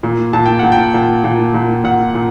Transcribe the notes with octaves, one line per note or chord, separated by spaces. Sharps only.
A#2
A#2 A5
G5
A#2 F#5
G5
A#2
A#2
A#2
A#2 F#5
A#2